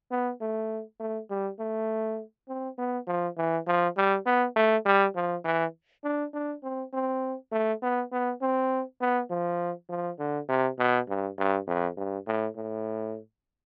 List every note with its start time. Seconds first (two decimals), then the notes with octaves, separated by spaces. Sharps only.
0.11 B3
0.41 A3
1.00 A3
1.30 G3
1.59 A3
2.48 C4
2.78 B3
3.07 F3
3.37 E3
3.67 F3
3.97 G3
4.26 B3
4.56 A3
4.85 G3
5.15 F3
5.45 E3
6.04 D4
6.34 D4
6.63 C4
6.93 C4
7.52 A3
7.82 B3
8.12 B3
8.42 C4
9.01 B3
9.30 F3
9.89 F3
10.19 D3
10.49 C3
10.79 B2
11.08 G2
11.38 G2
11.67 F2
11.97 G2
12.27 A2
12.56 A2